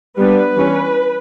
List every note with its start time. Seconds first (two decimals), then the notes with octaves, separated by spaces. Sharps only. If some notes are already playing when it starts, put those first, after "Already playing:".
0.17 G3 B3 D4 B4
0.56 E3 G3 C#4